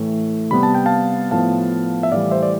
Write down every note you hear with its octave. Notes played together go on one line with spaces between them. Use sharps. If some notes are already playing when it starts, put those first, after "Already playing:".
Already playing: A2 E3 A3
C3 G3 B3 B5
A5
G5
F5 A5
A2 F3 B3 F5 A5
E5
A2 E3 G3 D5 F5
C5 E5
D5